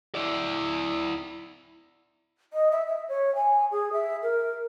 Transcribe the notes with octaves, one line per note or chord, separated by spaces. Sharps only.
E4 D5
D#5
E5
E5
C#5
G#5
G#4
E5
A#4